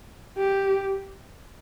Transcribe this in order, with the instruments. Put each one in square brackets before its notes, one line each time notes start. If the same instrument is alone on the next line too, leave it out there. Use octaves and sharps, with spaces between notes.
[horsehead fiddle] G4